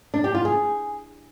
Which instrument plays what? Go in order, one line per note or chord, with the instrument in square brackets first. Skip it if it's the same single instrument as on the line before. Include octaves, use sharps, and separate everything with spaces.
[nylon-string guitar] D4
G4
F4
G#4